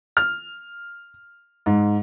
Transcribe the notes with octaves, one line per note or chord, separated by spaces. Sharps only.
F6
G#2